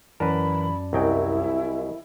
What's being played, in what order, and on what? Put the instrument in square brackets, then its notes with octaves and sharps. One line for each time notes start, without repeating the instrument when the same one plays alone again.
[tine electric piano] F#2 D5 A5 [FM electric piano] E3 [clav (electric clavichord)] A#4 B4 [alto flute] B5
[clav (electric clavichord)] C2 F#3 G5 [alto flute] E4 [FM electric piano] A#4 D#5 G#5